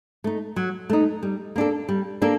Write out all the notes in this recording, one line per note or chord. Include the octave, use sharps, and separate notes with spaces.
A3 D#4
F#3
A3 D#4
G3
A#3 D4 A4
G3
A#3 D4 A4